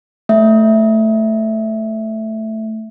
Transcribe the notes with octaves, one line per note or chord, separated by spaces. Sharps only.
A3 E5